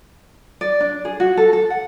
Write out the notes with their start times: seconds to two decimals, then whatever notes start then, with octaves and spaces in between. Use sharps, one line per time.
0.61 D5
0.81 D4
1.05 G#4
1.20 F#4
1.37 A4
1.53 A4
1.70 F#5